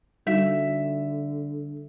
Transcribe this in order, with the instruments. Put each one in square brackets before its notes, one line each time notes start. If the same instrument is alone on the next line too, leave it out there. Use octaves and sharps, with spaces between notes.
[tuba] D3 [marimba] G3 D#4 F#4 [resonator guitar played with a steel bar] E5